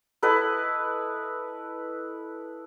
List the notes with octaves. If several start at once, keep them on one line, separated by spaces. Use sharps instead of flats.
E4 A4 B4 D#5